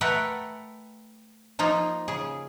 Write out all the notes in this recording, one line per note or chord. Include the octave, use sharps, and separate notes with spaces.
A3 A#4 B4 F#5 G5
F3 A#3 D#4 F4
C#3 G#4